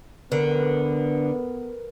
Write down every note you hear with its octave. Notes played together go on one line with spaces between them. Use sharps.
D3 B3 A#4 B4